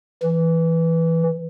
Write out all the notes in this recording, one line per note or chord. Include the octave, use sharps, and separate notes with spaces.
E3